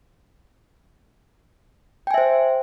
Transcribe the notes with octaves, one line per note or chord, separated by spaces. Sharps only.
C5 E5 G5 G#5